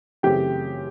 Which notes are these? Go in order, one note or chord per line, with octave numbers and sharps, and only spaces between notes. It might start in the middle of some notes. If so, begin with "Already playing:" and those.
F#2 C#3 E3 A3 C4 G4 G5